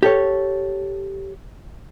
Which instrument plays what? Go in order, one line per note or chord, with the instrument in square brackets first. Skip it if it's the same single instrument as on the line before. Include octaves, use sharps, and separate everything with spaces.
[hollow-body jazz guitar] G4 A4 C#5